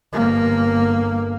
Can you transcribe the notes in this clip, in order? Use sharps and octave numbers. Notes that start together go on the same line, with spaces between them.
G1 A#3